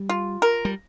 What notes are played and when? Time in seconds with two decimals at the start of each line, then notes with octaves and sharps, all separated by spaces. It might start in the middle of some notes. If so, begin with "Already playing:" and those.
Already playing: G3
0.09 F4
0.42 A#4
0.65 G3